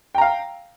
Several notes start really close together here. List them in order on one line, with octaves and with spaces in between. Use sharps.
G5 A#5 F5